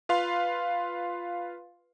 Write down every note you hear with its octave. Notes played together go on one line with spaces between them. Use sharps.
F4 B4 F5 C6